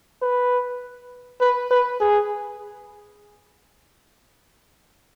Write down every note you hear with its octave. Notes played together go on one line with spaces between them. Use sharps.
B4
B4
B4
G#4